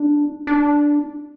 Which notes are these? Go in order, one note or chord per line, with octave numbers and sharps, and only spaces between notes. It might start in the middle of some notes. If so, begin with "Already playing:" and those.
Already playing: D4
D4